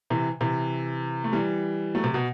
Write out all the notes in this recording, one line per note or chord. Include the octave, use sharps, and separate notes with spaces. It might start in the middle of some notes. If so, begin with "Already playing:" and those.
C3 E3
C3 E3
A3
E3 G3
F#3 A3
C3
B2